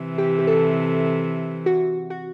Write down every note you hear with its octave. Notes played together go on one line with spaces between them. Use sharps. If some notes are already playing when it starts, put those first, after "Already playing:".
Already playing: C3 E3
G4
G4
A4
F#4
F#4